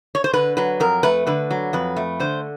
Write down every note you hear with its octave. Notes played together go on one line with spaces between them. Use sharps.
C#5
C5
D3 B4
F#3 B4
F2 A#4
A3 B4
D3 B4
F#3
F2 B4
A3
D3 C5